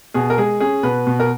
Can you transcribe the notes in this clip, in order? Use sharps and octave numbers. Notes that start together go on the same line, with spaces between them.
B2 G#4
A#4
G#3 G#4
C#4 G#4
B2 B4
B2
A#4